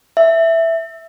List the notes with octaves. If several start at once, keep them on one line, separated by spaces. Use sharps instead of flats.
E5